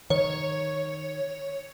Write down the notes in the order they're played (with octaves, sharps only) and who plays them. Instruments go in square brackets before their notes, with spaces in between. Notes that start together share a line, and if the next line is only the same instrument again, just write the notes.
[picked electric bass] D#3 [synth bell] C#5